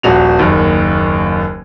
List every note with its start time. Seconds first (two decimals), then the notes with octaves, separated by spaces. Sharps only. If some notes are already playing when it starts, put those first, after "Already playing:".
0.03 D#1 A#1 F#4 F7
0.39 F#1 D#2